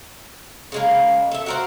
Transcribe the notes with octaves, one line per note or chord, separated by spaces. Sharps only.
C#3 G#3 A#3
A4 E5
F#4 A#4 C5